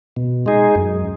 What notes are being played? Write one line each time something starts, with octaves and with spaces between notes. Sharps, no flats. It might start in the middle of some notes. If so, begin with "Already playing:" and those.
B2
G#3 D#4 G#4
F#2